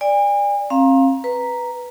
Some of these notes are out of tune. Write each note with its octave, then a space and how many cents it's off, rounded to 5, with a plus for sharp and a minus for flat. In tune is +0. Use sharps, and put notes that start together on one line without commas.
D5 +0 G#5 -40
C4 +40 F5 +0 A#5 +15
B4 +0 A#5 +0